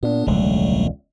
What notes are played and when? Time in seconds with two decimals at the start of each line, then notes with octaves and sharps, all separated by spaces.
0.03 A#2 B3 D4
0.27 E1 C#2 D3 F#3 G3 A3